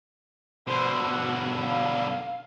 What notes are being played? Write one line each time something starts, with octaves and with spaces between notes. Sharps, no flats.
B2 D3 C5
F#4
F5